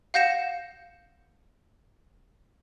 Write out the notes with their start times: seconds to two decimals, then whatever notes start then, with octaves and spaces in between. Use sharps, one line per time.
0.14 F5 F#5 G6 A#6 C#7 E7